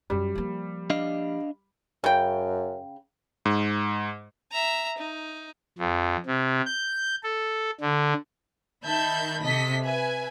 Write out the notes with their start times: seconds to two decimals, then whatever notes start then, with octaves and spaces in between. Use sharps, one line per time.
0.10 F#2 G3
0.35 F3 A#3
0.90 D4 D#5 F5
2.04 F#2 C#3 G5
3.45 G#2
4.52 E5 A#5
4.98 D#4
5.78 F2
6.26 C3
6.66 G6
7.23 A4
7.80 D3
8.84 D#3 E5 A5 B5 G6
9.44 C3 A4 D#5 B6
9.86 B4 E5 G#5